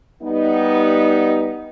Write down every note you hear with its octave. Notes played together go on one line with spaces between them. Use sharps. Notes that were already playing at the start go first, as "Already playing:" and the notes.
G3 B3 D#4